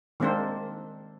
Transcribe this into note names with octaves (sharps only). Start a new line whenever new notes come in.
D#3 G#3 A#3 C4 D4 C5